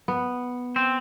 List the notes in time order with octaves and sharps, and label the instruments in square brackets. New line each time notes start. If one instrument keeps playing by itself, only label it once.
[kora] B3
[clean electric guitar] C4